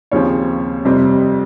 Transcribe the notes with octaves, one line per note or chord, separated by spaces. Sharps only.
D#2 C#3 F3 C4 C#5
F2 C3 G3 C4